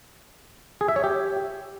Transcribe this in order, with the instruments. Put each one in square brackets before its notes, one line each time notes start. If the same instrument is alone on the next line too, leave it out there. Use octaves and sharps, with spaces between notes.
[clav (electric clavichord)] G#4
E5
C#5
G4